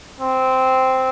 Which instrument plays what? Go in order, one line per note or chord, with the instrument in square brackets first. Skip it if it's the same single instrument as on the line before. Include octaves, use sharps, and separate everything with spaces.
[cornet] C4